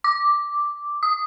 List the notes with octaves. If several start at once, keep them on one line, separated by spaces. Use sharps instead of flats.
D6
D#6